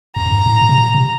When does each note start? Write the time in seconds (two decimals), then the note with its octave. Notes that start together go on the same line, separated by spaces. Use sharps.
0.16 F2 A#5
0.26 F2
0.31 G2
0.46 A2
0.61 A#2
0.69 C3
0.78 A#2
0.95 C3